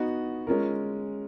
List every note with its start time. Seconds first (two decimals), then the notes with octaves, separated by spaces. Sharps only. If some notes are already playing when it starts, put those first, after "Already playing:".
Already playing: B3 D#4 F#4
0.47 G#3 C#4 F4 A#4